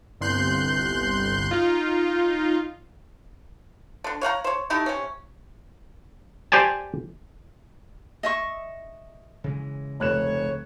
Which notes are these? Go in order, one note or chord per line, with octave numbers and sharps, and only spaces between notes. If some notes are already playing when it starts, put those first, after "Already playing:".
G1 C2 C6 F#6 G6
D#4 F4
D3 D4
C#5 F5 F#5 A#5
C5 C#5
A3 D#4 E4 G4
C3 C#4
G4 C5 D5 G#5 A5
D#5 E5 C#6
C#3 E3 G#3
F1 C#2 C#5 F#6 E7